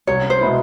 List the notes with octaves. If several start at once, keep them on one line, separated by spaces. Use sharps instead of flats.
C2 C#5
C5
B2 G#3 B3 E4